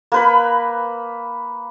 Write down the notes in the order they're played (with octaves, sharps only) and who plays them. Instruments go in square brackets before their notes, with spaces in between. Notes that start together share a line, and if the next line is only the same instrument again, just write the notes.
[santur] A#3 B4 B5